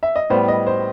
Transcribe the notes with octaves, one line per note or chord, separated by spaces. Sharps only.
E5
D#5
A2 G3 B3 C5
D#5
C5